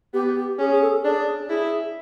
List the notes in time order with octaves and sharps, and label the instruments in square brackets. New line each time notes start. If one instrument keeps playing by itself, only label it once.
[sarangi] B3 [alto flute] G4
[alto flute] G4
[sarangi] C#4 [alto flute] G#4
[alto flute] G#4
A4
[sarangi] D4 [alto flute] G#4
[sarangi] E4 [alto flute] G#4